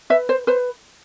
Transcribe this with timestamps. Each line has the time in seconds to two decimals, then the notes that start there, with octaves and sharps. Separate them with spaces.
0.10 B4 E5
0.29 C5
0.47 B4 C5